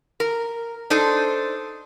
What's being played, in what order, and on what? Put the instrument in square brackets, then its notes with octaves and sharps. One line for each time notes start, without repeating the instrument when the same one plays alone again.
[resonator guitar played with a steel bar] A#4
D4 D#4 A4 C5